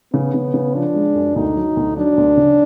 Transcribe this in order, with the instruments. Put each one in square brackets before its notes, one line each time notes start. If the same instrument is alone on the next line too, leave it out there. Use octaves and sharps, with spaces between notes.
[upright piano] C#3 [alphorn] B3
[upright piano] C#3
C#3
[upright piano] F3 [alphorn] D4
[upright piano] G#3
F#2
[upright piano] D2 [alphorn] D#4
[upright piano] F#3
D2
[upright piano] F#3 [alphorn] D4
[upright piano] D2
C#3